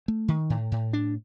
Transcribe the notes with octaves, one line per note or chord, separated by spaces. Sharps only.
A3
D#3
A2
A2
D4